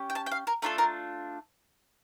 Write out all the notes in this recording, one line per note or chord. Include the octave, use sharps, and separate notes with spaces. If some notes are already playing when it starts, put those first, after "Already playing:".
Already playing: C#4 G4
G5
A5
G5
F5
A#4
A3 D4 F4 A4 A#4
A#4